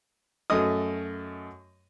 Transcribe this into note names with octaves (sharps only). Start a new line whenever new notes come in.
F#2 A3 D#5 D#6